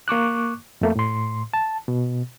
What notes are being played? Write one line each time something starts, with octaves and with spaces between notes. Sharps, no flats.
A#3 C#6 D6 F#6
F2 A3 A#3
A2 C6
A5
B2